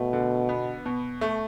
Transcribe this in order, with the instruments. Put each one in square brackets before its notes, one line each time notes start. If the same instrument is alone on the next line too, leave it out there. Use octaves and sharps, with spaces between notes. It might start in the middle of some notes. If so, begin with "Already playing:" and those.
Already playing: [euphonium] B2 [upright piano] A3
[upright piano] D3
B3
B2
A3